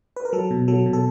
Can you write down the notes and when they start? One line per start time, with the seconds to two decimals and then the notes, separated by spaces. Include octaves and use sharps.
0.16 B4
0.25 A#4
0.33 F#3 A4
0.51 B2
0.68 F#3 A4
0.86 B2
0.93 A4